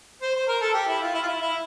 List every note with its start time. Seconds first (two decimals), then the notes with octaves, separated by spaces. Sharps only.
0.21 C5
0.35 C5
0.48 A#4
0.61 A4
0.74 G4
0.88 E4
1.01 F4
1.14 E4
1.22 F4
1.27 E4
1.41 E4